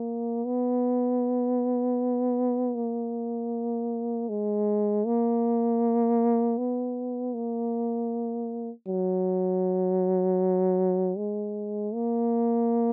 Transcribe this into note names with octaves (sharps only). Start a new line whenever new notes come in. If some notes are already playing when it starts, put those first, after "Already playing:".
Already playing: A#3
B3
A#3
G#3
A#3
B3
A#3
F#3
G#3
A#3